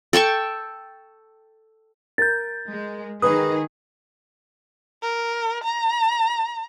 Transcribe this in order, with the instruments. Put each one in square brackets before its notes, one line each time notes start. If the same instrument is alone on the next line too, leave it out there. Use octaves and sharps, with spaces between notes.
[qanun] A4 G5 A5 C#6
[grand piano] A#4 [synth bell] G6 A6
[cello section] G#3
[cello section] D#3 G#4 [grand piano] B4 [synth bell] D#6
[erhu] A#4
A#5